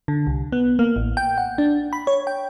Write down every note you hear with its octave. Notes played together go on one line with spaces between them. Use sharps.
D3
C2
B3
A#3
A1
G5
F#5
D4
B5
C#5
G5